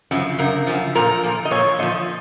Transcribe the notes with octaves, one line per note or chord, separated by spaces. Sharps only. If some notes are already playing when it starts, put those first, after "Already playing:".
F#2 C#3 F3
F#2 C#3 A#4
F#2 C#3 F3
A#2 F3 A#4
A#2 F3
D#5
A#2 F3 C#5
A#2 F3 D#5